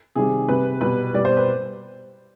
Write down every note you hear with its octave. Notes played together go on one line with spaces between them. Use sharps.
C3 D#3 G3 G#4
C3 G3 B4
B2 G3 B4
B2 G3 D5
C5
B4